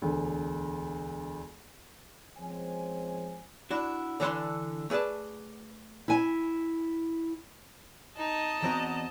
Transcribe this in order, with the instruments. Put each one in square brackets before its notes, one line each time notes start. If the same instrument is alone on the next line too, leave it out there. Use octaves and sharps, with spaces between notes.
[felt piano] E1 D2
[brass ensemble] F3 G#3 C4 C#4 C5 G#5
[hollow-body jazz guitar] D4 E4 F#4
D3 E3 D4 C#5 A5 C6
A3 G#4 B4 D5 A5
[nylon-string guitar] E4 G#5
[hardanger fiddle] D#4 [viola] D#5 A5
[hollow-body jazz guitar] E2 C4 F#4 [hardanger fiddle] A#5